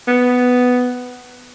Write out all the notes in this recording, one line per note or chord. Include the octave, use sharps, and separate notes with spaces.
B3